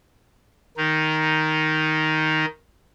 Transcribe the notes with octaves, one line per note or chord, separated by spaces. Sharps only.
D#3 D#4